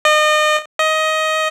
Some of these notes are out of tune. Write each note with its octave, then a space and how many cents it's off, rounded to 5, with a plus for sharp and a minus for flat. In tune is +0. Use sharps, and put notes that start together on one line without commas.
D#5 -35
D#5 +15